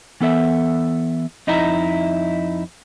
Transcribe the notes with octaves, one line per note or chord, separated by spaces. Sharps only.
E3 B3 A4 E5
F2 D#4 E4 D#5 E5 A#5